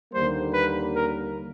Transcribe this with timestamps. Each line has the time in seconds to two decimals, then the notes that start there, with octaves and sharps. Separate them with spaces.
0.13 D#2 D3 G3 A#3 C5
0.54 B4
0.95 A#4